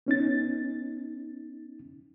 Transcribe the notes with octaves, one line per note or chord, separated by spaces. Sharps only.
B3 C#4 D#4 A6